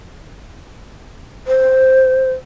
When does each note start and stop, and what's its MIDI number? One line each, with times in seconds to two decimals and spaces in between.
1.47 2.32 72